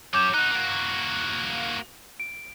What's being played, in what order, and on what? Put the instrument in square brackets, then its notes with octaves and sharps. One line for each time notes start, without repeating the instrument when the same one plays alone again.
[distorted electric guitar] F#3 C#4 [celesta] D6 G6 E7
[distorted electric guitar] D#4 F#4 [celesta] F#6
[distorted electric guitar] A#3 F#4
[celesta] D7